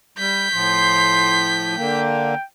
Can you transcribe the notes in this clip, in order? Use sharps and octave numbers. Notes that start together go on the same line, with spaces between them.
G3 G6 B6
A2 F3 C6
D3 A#3 G5